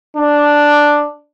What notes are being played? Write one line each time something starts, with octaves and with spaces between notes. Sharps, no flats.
D4